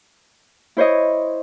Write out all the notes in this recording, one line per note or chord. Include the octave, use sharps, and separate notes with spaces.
E4 C5 C#5 D#5